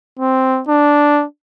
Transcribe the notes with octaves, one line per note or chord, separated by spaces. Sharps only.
C4
D4